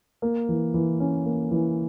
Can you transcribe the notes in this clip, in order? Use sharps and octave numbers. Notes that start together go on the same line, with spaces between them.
A#3
E3
E3
C#4
A#3
E3